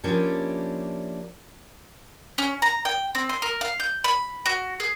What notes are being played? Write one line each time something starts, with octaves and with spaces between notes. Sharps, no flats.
F3 A#3 C#4 D4 E4 G4
C#4
A#5
G5
C4
C6
A#4
F5
G6
B5
F#4
G#4